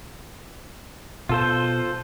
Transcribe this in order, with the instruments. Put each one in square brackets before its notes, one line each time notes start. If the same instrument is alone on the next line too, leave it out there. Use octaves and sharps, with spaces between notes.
[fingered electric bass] B2 [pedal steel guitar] F4 A4 C5